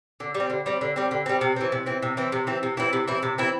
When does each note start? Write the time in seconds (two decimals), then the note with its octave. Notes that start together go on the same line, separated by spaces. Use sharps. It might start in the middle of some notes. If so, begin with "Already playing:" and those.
0.20 D3
0.34 G3
0.40 C4
0.50 D3
0.66 G3 C4
0.81 D3
0.96 G3 C4
1.11 D3
1.26 G3 C4
1.41 C3
1.56 E3 C4
1.72 C3
1.86 E3 C4
2.02 C3
2.17 E3 C4
2.32 C3
2.47 E3 C4
2.63 C3
2.77 E3 C4 E4
2.93 C3
3.07 E3 C4 E4
3.23 C3
3.38 E3 C4 E4